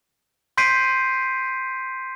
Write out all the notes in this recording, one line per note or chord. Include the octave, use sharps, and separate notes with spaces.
C6 G6 B6 C7 D7 D#7